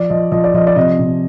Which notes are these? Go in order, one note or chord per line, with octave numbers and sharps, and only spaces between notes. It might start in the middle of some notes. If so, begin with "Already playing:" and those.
Already playing: F3 D5
F3 D#5
F3 D#5
D5
F3 D#5
D5
C3 D#5
C3